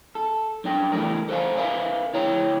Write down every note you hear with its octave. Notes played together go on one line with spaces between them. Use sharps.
A4
F#2 D4 G5
E3 G3 A3 A#4
A4 C5 D5 F5 G#5
A#4 B4 E5 F5 G#5
D2 E4 C#5 G5 A#5